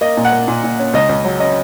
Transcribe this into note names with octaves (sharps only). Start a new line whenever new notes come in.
A#3 D#5
A#2
F#5
A#3
A#2
A#2
C#4
C#2 D#5
C#2
F#3
C#4 D#5